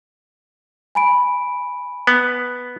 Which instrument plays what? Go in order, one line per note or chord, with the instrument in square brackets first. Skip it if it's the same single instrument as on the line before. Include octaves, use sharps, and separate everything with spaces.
[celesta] G#5 B5 D7
[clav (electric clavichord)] B3